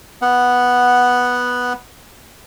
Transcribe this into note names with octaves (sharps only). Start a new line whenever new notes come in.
B3 F#5